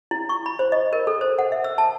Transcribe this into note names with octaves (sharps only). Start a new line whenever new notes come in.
E4
C#6
B5
C5
D#5
A#4
A4
C5
F#5
E5
E6
A5